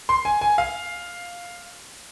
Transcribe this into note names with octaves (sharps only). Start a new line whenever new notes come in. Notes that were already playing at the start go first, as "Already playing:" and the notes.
C6
G#5
G#5
F5